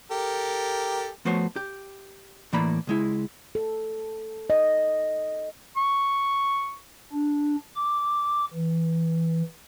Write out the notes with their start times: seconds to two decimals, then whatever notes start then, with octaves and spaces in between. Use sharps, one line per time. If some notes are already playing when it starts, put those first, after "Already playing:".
0.11 G4 A4 A#4
1.25 F3 A3 B3 F#4 C5 C#5
1.56 G4
2.53 A2 E3 A#3 D5 A#5 B5
2.87 C#2 G#3 E4
3.55 A4
4.50 D#5
5.77 C#6
7.13 D4
7.76 D6
8.53 E3